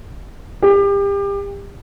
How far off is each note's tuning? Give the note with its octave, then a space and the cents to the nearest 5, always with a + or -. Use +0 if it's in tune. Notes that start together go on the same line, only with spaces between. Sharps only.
G4 +30